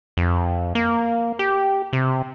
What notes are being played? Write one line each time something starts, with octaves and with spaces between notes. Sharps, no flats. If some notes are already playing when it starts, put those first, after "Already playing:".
F2
A#3
G4
C3